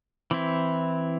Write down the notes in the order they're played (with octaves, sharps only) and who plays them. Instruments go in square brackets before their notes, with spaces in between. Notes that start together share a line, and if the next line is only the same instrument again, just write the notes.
[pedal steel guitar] E3 C4 E4